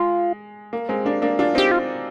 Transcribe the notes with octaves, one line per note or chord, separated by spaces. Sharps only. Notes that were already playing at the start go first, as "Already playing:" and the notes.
Already playing: G#3 F4
A#3
G#3 C4
A#3 D4
A#3 D4
D4 F4
C4 D#4 G4
F4